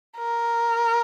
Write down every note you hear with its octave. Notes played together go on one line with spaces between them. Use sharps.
A#4